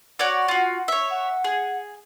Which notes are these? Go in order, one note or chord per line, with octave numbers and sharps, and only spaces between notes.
F#4 C#5 D5 F#5
F4 F#4
C#5 E5
F#5
G#4